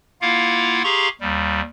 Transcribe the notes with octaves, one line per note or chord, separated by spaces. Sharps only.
A#3 E4 F4 F5 F#5
G4 G#4 F5 A#5 C6 C#6
D#2 G3